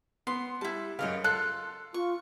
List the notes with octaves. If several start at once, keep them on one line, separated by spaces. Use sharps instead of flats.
B3 C6
G3 E4 A5
F#2 C#3 C#5 D#5 F5
F4 A4 F#6
F4 C#6